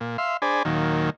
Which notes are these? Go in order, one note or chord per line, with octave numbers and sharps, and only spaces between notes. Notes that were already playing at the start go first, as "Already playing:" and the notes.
A#2
E5 F5 C6
D4 G#4 C5 D5 G#5 B5
D#2 A#2 D#3 F#3